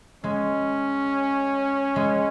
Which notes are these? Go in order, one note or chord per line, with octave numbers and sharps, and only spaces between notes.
G#3 C#4
G#3